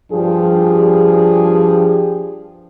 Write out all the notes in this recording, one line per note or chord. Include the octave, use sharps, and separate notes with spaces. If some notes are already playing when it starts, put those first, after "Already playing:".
G2 F3 D4 G4 G#4